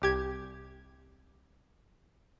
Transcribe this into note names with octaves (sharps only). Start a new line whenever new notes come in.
C2 G4 G#6